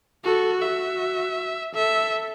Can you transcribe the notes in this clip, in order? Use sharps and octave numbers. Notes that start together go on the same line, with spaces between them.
F#4 A4
F#4 E5
A4 E5